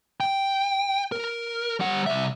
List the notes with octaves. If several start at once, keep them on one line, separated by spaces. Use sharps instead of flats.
G5
A#4
G3 F#5
C2 E5